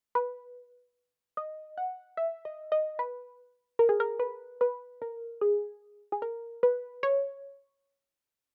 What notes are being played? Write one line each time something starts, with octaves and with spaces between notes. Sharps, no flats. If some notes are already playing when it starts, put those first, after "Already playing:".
B4
D#5
F#5
E5
D#5
D#5
B4
A#4
G#4
A#4
B4
B4
A#4
G#4
G#4
A#4
B4
C#5